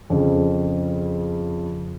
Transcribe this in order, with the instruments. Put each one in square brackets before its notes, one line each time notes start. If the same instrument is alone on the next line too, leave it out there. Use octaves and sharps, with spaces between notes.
[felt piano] F2 C#3